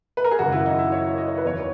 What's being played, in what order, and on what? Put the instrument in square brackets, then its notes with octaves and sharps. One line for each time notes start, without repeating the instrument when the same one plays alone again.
[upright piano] B4
A#4
G#4
G#1 F#2 C#3 F#4
E4
D#4
E4
C#5
D#5
C#5
B4
E2 D#3 F#3 B3 C#5